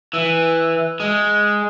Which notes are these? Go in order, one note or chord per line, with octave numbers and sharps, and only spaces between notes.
E3
G#3